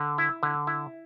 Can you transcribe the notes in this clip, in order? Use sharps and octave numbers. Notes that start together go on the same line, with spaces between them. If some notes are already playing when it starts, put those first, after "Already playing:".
Already playing: D3
E4
D3
E4